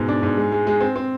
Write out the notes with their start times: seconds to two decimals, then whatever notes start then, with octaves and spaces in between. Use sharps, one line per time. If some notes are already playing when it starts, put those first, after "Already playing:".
Already playing: G#2 B2
0.08 D4
0.23 G#2
0.37 G#3
0.52 G#3
0.67 G#3
0.81 C4
0.96 C4